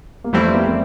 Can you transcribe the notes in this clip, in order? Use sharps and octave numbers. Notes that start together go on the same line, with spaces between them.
A#3
F2 E3 G3 A3 C4 E4
A#3
A#3